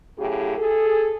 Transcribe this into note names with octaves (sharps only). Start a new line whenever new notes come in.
A2 C#3 F#3 G4 G#4
G#4 A4